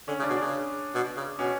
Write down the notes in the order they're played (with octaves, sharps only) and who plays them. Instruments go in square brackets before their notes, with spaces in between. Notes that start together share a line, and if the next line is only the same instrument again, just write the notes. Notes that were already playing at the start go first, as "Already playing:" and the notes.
[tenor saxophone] D3 [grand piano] C#4
[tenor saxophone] C#3
[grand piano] D4
[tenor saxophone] B2
[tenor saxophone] C#3 [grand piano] D4
[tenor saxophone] B2
C#3
[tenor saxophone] B2 [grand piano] C#4